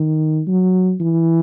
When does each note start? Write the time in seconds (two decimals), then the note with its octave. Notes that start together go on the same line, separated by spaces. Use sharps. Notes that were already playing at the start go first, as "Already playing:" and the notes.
Already playing: D#3
0.47 F#3
1.00 E3